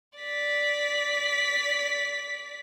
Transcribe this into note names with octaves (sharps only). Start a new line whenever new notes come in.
D5 B6